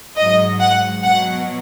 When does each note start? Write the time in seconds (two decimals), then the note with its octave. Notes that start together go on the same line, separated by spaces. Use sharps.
0.17 G#2 F#3 D#5
0.60 F#5
1.03 B2 F#3 F#5